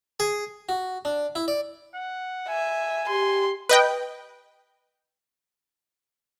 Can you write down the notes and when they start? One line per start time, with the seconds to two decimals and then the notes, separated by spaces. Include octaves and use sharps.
0.20 G#4
0.69 F#4
1.05 D4
1.35 E4
1.48 D5
1.95 F#5
2.49 E5 G#5
3.09 G4 C6
3.69 B4 D#5 G5